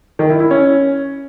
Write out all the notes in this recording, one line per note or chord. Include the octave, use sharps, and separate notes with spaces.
D#3
E4
E4
C#4